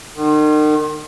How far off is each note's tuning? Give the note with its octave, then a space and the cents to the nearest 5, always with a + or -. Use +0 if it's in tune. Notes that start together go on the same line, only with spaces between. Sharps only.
D#3 -40